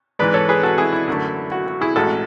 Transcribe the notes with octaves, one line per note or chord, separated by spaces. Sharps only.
G#2 E3 G#3 B4 D5
A4 C#5
G#4 B4
F#4 A4
E4 G#4
E4
F#2 D3 A3
F#4
F#4
E4 G#4
A1 A2 G#3 F#4 A4